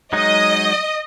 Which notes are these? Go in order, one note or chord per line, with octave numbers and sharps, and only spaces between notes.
F#3 G#3 D#4 D#5